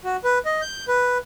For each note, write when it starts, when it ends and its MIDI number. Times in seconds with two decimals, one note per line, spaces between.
0.04 0.16 66
0.24 0.39 71
0.45 0.61 75
0.61 0.85 91
0.88 1.18 71